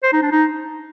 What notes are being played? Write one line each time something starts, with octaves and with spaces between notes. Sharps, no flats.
C5
D#4
D4
D#4